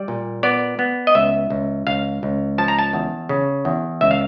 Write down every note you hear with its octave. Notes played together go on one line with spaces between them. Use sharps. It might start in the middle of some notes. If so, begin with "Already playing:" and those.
Already playing: G3 D5
A#2
B3 D5
B3
D#5
C#2 E5
C#2
C#2 F5
C#2
F3 A5
A#5
A5
E2
C#3
E2
C#2 E5
F5